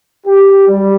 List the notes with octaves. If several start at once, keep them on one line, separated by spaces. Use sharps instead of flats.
G4
G3